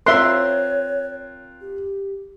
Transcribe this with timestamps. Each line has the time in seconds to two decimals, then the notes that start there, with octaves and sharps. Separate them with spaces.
0.06 C4 F4 A#4 C#5 E5 C6 F#6
1.61 G4